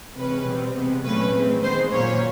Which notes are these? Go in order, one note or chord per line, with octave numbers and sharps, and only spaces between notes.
C3 E3 G#3 C#4 B4
B2 G3 C4
C3 E3 G#3 B3
A#2 F#3 A3 C#4 B4
E3 G#3 C4
D#3 G#3 B3 C5
A#2 F#3 A#3 C#4 C#5